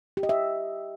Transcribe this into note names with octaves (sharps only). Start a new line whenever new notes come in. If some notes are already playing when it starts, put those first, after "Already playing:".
G4
D#5
E5